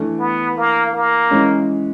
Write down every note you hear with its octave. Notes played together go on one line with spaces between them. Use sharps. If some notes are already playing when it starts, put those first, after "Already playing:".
Already playing: E3 A3 D4
B3
A#3
A#3
E3 G#3 C#4